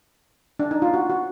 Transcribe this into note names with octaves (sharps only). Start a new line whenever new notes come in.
D4
D#4
F4
F#4
F#4